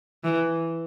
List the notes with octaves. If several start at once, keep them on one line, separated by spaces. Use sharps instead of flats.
E3